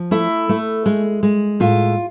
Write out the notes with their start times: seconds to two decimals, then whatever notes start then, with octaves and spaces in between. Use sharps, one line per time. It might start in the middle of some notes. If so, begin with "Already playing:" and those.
Already playing: F3
0.11 A3 E4
0.49 A3
0.86 G#3
1.23 G#3
1.60 A2 F4